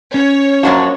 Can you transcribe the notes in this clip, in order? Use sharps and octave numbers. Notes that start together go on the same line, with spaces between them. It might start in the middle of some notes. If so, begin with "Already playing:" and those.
C#4 C#5
F#2 F3 F#3 A#3 D4 F#4